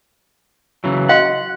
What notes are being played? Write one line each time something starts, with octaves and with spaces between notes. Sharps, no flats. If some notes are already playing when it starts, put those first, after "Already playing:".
C#3 E3 F#3
F#4 D#5 F5 F#5